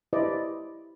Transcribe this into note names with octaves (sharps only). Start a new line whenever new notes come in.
E4 G4 B4 C5 D5 D#5